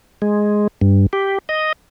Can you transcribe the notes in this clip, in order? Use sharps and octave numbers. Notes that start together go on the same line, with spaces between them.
G#3
G2
G4
D#5